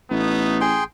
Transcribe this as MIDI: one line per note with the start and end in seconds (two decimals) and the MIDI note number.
0.11 0.82 33
0.11 0.62 57
0.11 0.62 59
0.11 0.62 63
0.61 0.84 68
0.61 0.84 79
0.61 0.84 84